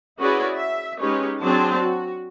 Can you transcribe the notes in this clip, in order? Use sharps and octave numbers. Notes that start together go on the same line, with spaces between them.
C#4 E4 F#4 G#4 B4 D5
E5
G#3 C#4 D#4 G4 B4 C#5
F#3 C4 D4 G#4 C5 A5
F#4